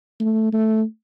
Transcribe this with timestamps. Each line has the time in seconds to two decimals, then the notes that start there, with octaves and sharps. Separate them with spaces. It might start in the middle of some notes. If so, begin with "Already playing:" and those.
0.20 A3
0.53 A3